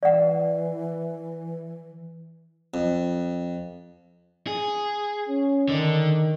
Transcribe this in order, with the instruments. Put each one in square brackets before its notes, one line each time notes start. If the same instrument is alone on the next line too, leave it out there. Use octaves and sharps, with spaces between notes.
[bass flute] E3 [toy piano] D5 F#5
[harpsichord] F2
[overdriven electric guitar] G#4
[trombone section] C#4
[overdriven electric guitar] D3 [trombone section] D#3